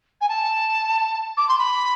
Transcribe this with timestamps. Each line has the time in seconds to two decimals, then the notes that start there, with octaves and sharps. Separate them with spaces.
0.21 G#5
0.29 A5
1.37 D6
1.48 C6
1.59 B5